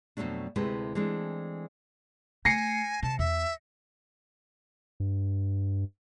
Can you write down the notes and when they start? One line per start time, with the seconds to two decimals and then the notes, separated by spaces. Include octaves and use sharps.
0.17 F2 B2 D#3 F#3 A3 D4
0.56 D2 C3 G#3 A3 E4 B4
0.95 E3 G#3 A3 C4 D4
2.45 A3 G#5 A#6 C7 C#7
3.03 C3 A5
3.19 E2 E5
5.00 G2